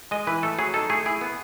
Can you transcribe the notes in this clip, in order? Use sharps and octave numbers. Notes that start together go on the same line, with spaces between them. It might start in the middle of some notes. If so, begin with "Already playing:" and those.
G#3 D#5
E3 B4
A3 A4
F#3 G#4
D#4 A4
A3 G#4
E4 G#4
B3